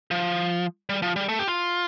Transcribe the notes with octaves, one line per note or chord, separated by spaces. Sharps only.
F3
G3
F3
G3
A3
G4
F4